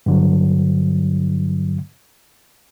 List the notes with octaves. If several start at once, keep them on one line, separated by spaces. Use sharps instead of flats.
G2 D3 F#3